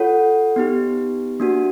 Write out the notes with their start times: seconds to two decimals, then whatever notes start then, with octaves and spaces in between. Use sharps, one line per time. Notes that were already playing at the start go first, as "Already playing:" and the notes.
Already playing: F4 A4 C#5 F#5
0.56 B3 D#4 G4
1.40 A#3 D4 F#4